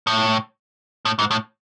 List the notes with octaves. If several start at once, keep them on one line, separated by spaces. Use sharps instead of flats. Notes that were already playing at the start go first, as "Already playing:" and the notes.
A2
A2
G#2
A2